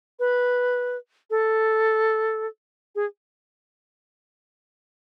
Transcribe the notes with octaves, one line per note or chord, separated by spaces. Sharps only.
B4
A4
G#4